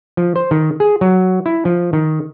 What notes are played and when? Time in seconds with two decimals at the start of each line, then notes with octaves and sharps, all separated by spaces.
0.17 F3
0.36 C5
0.51 D#3
0.80 G#4
1.01 F#3
1.46 E4
1.65 F3
1.93 D#3